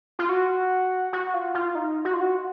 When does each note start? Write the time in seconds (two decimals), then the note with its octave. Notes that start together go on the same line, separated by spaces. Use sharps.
0.19 F4
0.29 F#4
1.13 F#4
1.34 F4
1.54 F4
1.75 D#4
2.05 F#4
2.14 F4
2.21 F#4